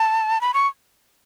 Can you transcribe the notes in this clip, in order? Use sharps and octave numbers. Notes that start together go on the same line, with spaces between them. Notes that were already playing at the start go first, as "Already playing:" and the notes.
Already playing: A5
B5
C#6